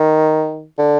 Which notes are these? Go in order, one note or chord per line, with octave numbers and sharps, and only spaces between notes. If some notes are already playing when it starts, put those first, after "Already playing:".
Already playing: D#3
D3